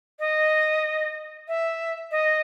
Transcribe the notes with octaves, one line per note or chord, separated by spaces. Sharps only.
D#5
E5
D#5